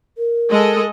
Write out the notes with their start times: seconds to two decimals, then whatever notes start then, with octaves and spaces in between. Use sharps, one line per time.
0.18 A#4
0.48 G#3 A4 D#5